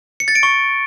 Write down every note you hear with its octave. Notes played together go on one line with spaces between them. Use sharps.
C#7
A6
D7
C#6